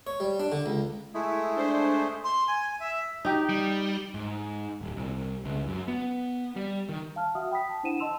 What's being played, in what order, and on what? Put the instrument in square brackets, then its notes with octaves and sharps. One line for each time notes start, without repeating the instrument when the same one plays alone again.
[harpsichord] C#5
G3
D4
D3
C#2
[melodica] G#3 A3 [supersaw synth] E4
[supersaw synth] D4 C5
[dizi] C6
G#5
E5
[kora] D#4 G4
[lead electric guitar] G3
[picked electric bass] G#2
D#1
C2
C#2
F#2
B3
G3
D#3
[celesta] F5 A5 F6
F#4 E5 F#5 D#6 F6
G5 B5 D#6 B6
A5
D4 E4 C5 F#5 D#7 E7
D#5 A5 C6 E6 F7